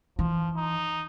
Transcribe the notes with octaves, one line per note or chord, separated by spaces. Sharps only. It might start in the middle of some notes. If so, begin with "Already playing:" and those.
E3 F3
D#4